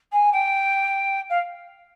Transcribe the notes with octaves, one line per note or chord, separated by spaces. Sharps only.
G#5
G5
F5